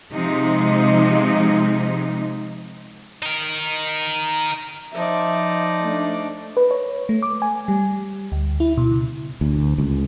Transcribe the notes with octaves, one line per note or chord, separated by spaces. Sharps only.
C3 F3 G#3 D#4
D#4 A#4
F3 D#4 D5 E5
A3 D4
B4
C#5
A3
D6
G#5
G3
D2
E4
B2
C#3
D2
C#2